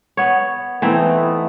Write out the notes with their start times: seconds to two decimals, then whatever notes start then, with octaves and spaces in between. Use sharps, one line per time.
0.17 B3 C#5
0.82 E3 A3 B3 C4 D#4